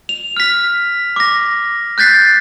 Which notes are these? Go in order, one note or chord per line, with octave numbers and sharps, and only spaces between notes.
F7
F6 B6
D6 A#6
F#6 G6 A6 B6 C7